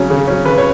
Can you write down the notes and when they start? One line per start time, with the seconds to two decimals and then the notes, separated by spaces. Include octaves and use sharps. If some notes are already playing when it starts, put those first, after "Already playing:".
Already playing: C#3 F#3 C#4 C#5
0.10 C#3
0.28 F#3 C#4
0.45 C#3 B4
0.58 C#5